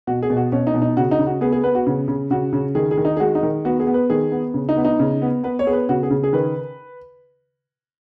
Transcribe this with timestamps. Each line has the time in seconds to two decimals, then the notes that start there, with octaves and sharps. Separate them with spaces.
0.07 B2 F#4
0.22 G#4
0.30 B2
0.37 F#4
0.52 B2 C#4
0.67 D#4
0.74 B2
0.82 D#4
0.97 C#3 F#4
1.11 D#4
1.19 C#3
1.27 F#4
1.41 B3 G#4
1.52 G#4
1.64 B3 B4
1.75 F#4
1.87 C#3
2.08 C#3
2.31 C#3 F#4
2.53 C#3
2.75 D#3 G#4
2.91 G#4
2.97 D#3
3.05 D#4
3.17 G#4
3.20 G#3 F#4
3.35 D#4
3.43 D#3
3.65 B3 F#4
3.80 G#4
3.87 B3
3.94 B4
4.10 D#3 G#4
4.32 B3
4.54 C#3
4.69 D#4
4.77 B3
4.85 D#4
4.99 C#3
5.22 B3
5.43 B3 B4
5.59 C#5
5.66 B3 G#4
5.73 B4
5.89 C#3 F#4
6.03 G#4
6.10 C#3
6.24 G#4
6.33 D#3 B4